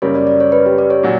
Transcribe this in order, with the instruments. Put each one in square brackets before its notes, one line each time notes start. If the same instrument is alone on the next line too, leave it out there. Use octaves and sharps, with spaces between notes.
[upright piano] F#2 C#3 G3 A#3 [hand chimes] C#5
[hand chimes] D5
D5
C#5
B4
G4
D5
C#5
[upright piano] A#2 F#3